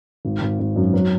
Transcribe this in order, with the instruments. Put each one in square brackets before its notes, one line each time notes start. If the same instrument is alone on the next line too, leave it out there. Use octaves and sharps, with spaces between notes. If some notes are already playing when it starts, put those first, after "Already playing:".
[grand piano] G#1
G#1
G#1
F#2
F#3